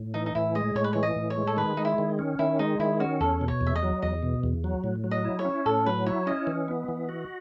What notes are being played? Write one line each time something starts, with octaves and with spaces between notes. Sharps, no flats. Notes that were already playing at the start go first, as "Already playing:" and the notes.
Already playing: A2
E3 D#4
D#4
A2 E4
G#3 D#5
A2 C#5
B4
E3 C#5
D#5
A2
C#5
G#3
A4
D#3 B4
G#3 D#4
E4
D#3
C#4
D#3 E4
G#3 D#4
D#3 E4
C#4 F#4
E2 A4
B2
C#5
E2
E5
D#5
F#3
E2 D#5
B2
E2
F#3
A2
F#3
D#5
E4
C#5
C#4
A2 A4
F#3 B4
E4 C#5
C#4 D#5
E3
B3
E3
F#4